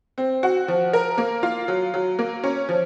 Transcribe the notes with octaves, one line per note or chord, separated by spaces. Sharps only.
C4
F#4
F3
A#4
A#3
F4
F#3
F#3
A#3
C#4
F3